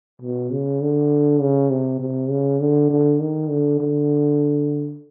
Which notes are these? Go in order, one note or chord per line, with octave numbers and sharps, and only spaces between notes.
B2
C#3
D3
C#3
C3
C3
C#3
D3
D3
D#3
D3
D3